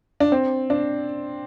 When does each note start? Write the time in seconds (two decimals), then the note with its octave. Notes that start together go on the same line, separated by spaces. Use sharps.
0.20 D4
0.32 C4
0.70 D4